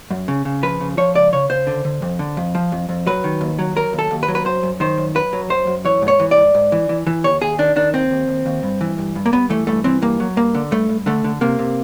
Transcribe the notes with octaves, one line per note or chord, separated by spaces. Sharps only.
F#2
C#3
C#3
F3 B4
C#3
F3 C#5
C#2 D5
C#3 C#5
C#3 C5
D3
D3
F2
D3
F2
F3
F2
F2
F#3 B4
D#3
D#2
F#3
F#3 A#4
D#2
A4
D#2
B4
F#3
B4
F#2 C5
F#2
D#3 C5
F#2
F#2 B4
F#3
F#2 C5
F#2
E3 C#5
G#2
C#5
E3
D5
G#2
G#2
E3
E3
E3
D#2 C#5
D#2 G#4
D#3 D4
D#3 D4
D#2 C4
D#2
D#2
D#2
G2
E3
G2
G2
A#3
G2 B3
E3 A3
G2 A3
E3 C4
G2 A#3
F#3
G2 A#3
D3
G2 A3
G2
D3 A3
D3
C3 A#3
C3